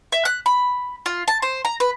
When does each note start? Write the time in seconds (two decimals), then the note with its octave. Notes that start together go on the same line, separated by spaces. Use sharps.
0.12 E5
0.25 F#6
0.46 B5
1.06 F4
1.28 A5
1.42 C5
1.65 A#5
1.80 B4